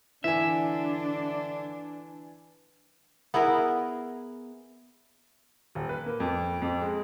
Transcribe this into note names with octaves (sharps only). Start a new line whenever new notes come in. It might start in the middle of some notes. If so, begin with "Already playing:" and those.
D3 E3 D4 E5 G#5
B3 E4 G#4 A#4
D#1
B4
A#3
F2
F2
G#3